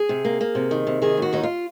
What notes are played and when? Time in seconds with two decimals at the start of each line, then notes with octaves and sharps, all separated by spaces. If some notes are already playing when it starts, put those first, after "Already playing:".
Already playing: G#4
0.09 C3
0.25 A#3
0.41 A#3
0.55 C3
0.71 D#3
0.87 C3
1.02 D#3 G#4
1.17 D#2 F#4
1.33 D#2 D#4
1.43 F4